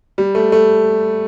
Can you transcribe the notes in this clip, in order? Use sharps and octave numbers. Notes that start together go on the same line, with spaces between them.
G3
A3
A3